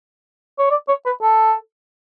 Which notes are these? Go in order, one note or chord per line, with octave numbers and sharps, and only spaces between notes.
C#5
D5
C#5
B4
A4